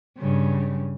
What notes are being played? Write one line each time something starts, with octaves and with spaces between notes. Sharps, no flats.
G2 C#3